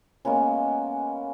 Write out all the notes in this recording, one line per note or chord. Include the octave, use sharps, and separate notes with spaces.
G#3 A#3 B3 C#4